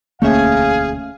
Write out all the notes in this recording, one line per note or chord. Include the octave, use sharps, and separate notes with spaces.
E1 D2 A3 A#3 C#4 G#4 E5 F5